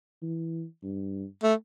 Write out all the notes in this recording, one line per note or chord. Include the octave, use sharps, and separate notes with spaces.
E3
G2
A3